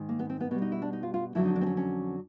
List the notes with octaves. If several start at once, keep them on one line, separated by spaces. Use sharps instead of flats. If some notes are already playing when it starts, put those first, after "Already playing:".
Already playing: G#2 D#3
A#3
B3
C4
B3
B2 G3 B3
D#4
E4
D4
D#4
F4
F4
F2 D3 F#3 E4
D#4
D4
C4
C#4
C#4